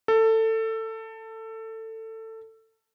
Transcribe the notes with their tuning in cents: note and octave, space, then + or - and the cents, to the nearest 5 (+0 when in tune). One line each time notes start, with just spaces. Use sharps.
A4 +20